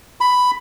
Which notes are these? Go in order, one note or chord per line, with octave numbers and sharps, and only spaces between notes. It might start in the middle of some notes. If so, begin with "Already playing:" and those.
B5